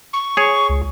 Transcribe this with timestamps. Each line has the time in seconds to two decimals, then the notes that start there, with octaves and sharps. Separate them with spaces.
0.13 C#6
0.37 G#4 C#5
0.69 C#2